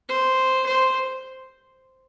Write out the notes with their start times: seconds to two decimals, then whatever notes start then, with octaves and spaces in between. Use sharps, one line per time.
0.09 C5
0.66 C5